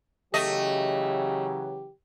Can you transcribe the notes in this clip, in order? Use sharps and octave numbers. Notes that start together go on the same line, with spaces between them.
C#3 E3 F#3 A3 G4 D#5